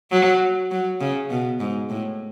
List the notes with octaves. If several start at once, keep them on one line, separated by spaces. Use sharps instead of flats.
F#3
F#3
C#3
B2
G#2
A2